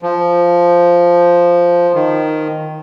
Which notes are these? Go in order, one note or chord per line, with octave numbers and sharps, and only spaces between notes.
F3
D#3